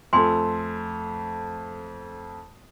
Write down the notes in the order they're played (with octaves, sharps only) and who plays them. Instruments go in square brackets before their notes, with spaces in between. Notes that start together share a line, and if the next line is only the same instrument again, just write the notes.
[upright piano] F2 A3 [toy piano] G#5 C6